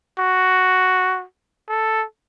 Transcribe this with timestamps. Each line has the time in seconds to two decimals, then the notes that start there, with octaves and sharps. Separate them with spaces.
0.18 F#4
1.69 A4